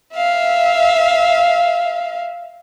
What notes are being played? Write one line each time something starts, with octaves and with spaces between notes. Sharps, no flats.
E5 F5